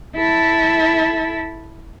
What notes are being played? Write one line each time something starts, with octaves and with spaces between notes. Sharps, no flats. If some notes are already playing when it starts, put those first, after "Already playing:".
E4 A4